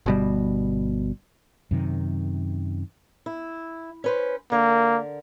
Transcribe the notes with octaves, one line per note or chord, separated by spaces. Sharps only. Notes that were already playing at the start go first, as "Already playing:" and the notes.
G1 B2 G3
F#2 C3 D#3
E4
C#4 B4 C5
D3 A#3 A#4